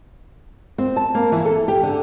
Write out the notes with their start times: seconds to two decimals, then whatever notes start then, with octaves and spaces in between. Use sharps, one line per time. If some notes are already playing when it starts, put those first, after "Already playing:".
0.78 C4
0.96 A5
1.15 A#3
1.32 E3
1.45 A4
1.68 G4
1.83 D3